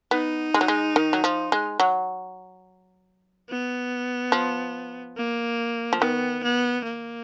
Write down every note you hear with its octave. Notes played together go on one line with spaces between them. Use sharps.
B3 D#4
G#3
F#3
G#3
D#3
F#3
F3
G#3
F#3
B3
F3
A#3
F3
D#3 B3
B3
A#3